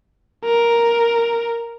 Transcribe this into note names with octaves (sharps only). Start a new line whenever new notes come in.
A#4